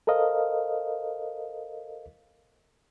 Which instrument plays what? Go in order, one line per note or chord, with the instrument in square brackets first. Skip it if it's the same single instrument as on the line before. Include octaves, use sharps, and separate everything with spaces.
[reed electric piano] A4 A#4 C5 D#5 F5